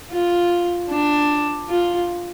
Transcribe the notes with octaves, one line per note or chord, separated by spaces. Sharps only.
F4
D4
F4